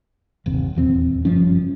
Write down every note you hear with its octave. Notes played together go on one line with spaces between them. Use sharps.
G1 D#2 C3
D#1 E2 F3 C4
F#1 G2 F3 C#4